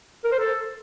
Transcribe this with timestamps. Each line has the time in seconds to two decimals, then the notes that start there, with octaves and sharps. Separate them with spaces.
0.25 A#4
0.32 C5
0.39 A4